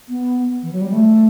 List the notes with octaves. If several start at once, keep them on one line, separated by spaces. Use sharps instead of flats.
B3
E3
F#3
G3
A3